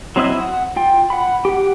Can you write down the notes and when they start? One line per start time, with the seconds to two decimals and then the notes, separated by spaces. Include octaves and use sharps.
0.16 F#3 C4 E4 D#5 E6
0.39 F#5
0.76 F4 G5
1.10 F#5 B5
1.45 G4 F#5